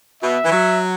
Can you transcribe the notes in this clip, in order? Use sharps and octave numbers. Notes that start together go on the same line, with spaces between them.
B2 E5
E3
F#3